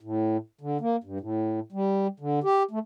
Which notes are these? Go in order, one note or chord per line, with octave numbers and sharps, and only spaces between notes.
A2
D3
A#3
G2
A2
G3
D3
G4
A3